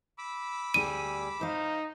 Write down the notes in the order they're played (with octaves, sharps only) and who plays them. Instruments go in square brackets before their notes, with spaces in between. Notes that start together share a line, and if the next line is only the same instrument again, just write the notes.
[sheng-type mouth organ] B5 D6 E6
[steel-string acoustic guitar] D2 G3 G#4 [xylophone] D#7
[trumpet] D#4 [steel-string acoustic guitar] C5 F5